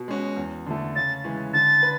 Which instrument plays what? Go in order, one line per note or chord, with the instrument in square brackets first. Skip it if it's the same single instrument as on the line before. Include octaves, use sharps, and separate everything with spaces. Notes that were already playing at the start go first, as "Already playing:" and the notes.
Already playing: [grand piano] B2
G#3 C#4 F#4
E2
D3 A3
[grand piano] C#3 [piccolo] A6
[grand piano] E3 G#3 C#4
[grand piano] D3 [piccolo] A6
[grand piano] B4